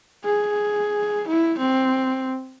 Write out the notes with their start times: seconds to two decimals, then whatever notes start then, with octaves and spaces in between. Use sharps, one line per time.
0.25 G#4
1.28 E4
1.59 C4